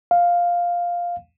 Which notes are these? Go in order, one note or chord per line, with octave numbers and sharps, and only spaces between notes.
F5